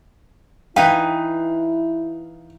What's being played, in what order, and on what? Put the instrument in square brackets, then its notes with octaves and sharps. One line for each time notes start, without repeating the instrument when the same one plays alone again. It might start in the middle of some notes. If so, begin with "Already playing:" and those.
[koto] E3 D#4 B4 [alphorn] E4 [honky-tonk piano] F5 [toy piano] G5